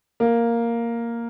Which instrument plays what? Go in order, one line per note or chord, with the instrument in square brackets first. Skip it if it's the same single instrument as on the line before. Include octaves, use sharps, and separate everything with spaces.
[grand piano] A#3